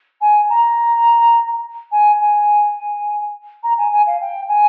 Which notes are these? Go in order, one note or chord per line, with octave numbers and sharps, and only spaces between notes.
G#5
A#5
G#5
G#5
A#5
G#5
G#5
F5
G5
G#5